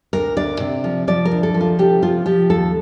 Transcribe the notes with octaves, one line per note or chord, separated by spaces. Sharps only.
D2 A#4
D2 D5
C3
F3
F3 D5
A#4
D2
A4
F3
F4
C3 G4
F3 F4
F3 G4
D#2 A4